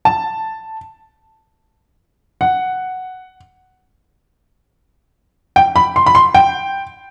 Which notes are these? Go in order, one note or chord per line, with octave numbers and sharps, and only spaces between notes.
A5
F#5
G5
B5
C6
B5
C6
G5